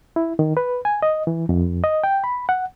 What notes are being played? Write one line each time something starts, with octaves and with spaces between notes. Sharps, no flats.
E4
D#3
B4
G#5
D#5
E3
F2
D#5
G5
B5
F#5